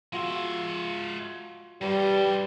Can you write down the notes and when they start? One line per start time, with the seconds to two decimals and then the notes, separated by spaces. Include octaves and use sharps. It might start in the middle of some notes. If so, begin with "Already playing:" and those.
0.13 G#3 F4 F#4 E5 C#6
1.82 G2 G3 B4 C5 D5